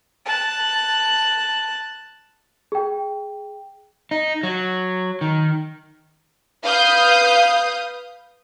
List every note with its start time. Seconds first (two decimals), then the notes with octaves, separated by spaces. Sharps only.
0.25 A5 F#6
2.72 G#4 G5
4.11 D#4
4.43 F#3
5.21 D#3
6.64 B4 F5 D#6 G6